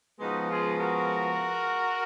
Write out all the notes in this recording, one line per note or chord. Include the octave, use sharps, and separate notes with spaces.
C#3 F3 G#3 B3 D#4 F#4
F4 G#4
F#4 A#4